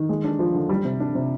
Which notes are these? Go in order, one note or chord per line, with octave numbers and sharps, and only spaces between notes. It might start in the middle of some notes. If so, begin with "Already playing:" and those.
Already playing: D#3
G#3
D4
F3
D3
G3
C3
D4
C3